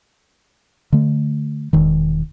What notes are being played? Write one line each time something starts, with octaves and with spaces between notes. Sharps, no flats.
D3 A3
E1 D#3